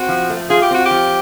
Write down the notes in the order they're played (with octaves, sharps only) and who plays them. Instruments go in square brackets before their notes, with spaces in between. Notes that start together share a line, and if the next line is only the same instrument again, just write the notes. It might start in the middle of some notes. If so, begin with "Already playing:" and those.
Already playing: [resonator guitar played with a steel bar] C4 [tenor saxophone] F#4
[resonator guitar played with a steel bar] F3
A3
[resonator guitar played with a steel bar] F4 [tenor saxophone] G#4
[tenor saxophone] G4
[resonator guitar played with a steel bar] C4 [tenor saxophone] F#4
[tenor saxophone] G4
[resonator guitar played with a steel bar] F3